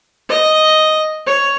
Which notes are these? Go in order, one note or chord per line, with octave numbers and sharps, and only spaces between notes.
D#5
C#5